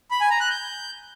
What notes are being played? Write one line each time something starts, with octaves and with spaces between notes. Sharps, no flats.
B5
G#5
A#5
F#6
G6